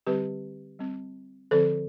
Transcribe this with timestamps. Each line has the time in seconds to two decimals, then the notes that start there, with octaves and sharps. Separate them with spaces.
0.07 D3 G3 C4 G4 B4
0.79 G3 C4
1.51 D3 F3 C4 A4 C5